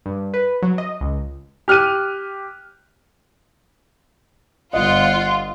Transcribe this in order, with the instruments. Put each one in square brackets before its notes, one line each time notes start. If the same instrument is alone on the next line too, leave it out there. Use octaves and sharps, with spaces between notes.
[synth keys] G2
B4
F#3
D#5
C#2
[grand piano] G4 F6 F#6 D#7
[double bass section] G1 [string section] F4 [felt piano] D#5 [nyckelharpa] F#5